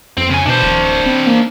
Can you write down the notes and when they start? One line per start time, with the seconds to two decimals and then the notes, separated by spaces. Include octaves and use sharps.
0.17 F2 C4
0.30 C#3 G#5
0.46 B2 D4 C5
0.63 D1
1.06 C4
1.26 A#3